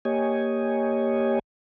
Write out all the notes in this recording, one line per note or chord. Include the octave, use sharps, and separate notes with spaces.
A#3 G4 C#5 D#5 G#5